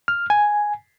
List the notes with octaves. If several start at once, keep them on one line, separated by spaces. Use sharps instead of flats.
F6
G#5